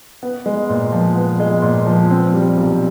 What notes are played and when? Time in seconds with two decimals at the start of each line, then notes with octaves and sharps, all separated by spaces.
0.23 B3
0.46 G#3
0.69 A#2
0.92 F3
1.16 B3
1.40 G#3
1.62 A#2
1.86 F3
2.10 C4
2.34 G3
2.57 B1